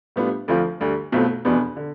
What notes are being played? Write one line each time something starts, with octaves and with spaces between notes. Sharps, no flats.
A2 G3 B3 D4 F4
D2 D3 F3 C4 F4
D2 D3 G3
B1 B2 A3 C4 F4
F1 E2 B2 B3 D4
D3